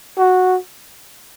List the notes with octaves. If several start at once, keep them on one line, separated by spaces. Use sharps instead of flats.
F#4